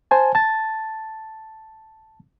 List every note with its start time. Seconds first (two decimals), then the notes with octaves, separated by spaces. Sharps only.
0.11 C5 G#5 A5
0.35 A5 A6